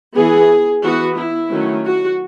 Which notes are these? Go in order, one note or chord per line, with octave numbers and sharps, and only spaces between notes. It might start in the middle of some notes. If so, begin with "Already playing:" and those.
E3 B3 G#4
E3 B3 F#4
E4
D#3 F#3 A3 C#4
F#4